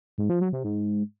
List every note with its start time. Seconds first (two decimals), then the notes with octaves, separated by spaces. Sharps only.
0.18 G#2
0.29 F3
0.41 F#3
0.53 C3
0.64 G#2